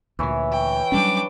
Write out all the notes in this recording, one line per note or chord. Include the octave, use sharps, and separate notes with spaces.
D2 A#2 E3 C#5
G5
F#3 G3 C#4 D4 D6